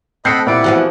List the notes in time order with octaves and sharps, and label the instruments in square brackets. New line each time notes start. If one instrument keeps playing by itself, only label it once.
[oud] C4 [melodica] A4 F#5 [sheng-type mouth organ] D#5 B5 [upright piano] G6 C7 C#7
[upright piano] A#2 F4 D7 [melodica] G3 B4 D5 [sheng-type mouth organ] E4 F#5
[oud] E3 F3 B3 [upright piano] F#4 G4